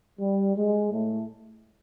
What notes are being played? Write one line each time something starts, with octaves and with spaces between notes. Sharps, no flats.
G3
G#3
A2 A3